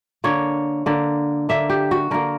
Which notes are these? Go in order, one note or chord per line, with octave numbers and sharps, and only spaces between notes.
D3 A#3 C#5
D3 A#3
D3 A#3 E5
G4
F#4
D3 A#3 A#4